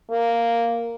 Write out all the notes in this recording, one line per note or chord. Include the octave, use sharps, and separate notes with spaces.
A#3